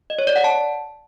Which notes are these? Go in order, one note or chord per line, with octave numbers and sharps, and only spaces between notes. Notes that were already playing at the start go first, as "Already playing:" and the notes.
D#5
C#5
D5
F#5
A5